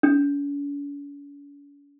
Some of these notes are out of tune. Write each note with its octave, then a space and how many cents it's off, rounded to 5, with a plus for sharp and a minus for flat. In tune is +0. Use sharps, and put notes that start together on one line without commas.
C#4 +45